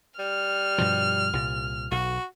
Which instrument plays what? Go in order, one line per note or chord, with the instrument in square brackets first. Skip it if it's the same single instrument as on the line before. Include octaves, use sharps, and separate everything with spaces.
[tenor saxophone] G3 [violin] F6
[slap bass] G2 B2 F3
C2 A#2
[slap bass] B1 [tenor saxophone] F#4